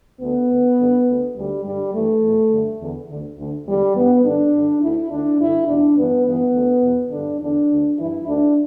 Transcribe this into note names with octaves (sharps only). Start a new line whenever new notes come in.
D2 D3 B3
D2 D3
G2 D3
D2 D3
D2 D3 G3
G2 D3 G3
G2 E3 A3
E2 B2
G2 D3
E2 D3
D2 D3
D2 D3
E2 D3 G3
G2 E3 B3
G2 D3 D4
G2 D3
D2 D3 E4
D2 D3 D4
G2 D3 E4
E2 B2 D4
G2 E3 B3
G2 E3 B3
D2 D3
E2 B2
G2 D3 D4
E2 D3 D4
D2 D3
G2 E3 E4
D2 D3 D4